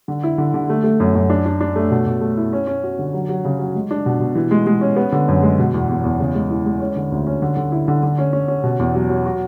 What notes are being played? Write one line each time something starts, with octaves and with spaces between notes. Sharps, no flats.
D3
E4
D3
D3
A3
A3
F#2
F#2
D4
D4
D4
A3
B2
B2
A3
E4
C#4
C#4
F#4
D3
F#3
F#3
C#3
F#3
G#3
D4
B2
B2
E3
G#3
G#3
C#4
B3
D3
F#2
G#3
B2
E2
E2
E2
C#3
G#3
E3
G#3
C#4
D3
D2
C#4
D3
D3
E4
D3
D3
C#4
C#4
C#4
B2
E2
F#3
F#3
F#4